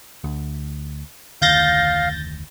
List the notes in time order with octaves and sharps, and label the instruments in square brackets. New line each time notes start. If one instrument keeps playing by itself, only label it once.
[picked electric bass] D2
[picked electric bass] F1 D2 D#3 [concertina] F5 [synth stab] G6 A6 A#6